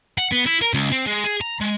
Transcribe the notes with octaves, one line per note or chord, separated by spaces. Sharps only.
F#5
B3
E4
A#4
C#2
C4
G#3
G#4
A#5
G#3